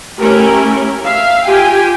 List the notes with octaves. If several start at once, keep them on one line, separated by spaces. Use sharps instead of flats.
A3 C#4 E4 G4 A#4
E5 F5
F4 G4 G5 G#5